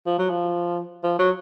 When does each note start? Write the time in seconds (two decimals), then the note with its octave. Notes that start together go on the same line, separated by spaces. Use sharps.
0.06 F3
0.19 F#3
0.30 F3
1.03 F3
1.19 F#3